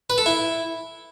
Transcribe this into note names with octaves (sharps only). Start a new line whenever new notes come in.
B4
A4
E4